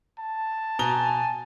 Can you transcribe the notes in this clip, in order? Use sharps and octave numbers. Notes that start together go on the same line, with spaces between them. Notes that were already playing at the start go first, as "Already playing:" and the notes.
A5
B2 G#5 A#5 G7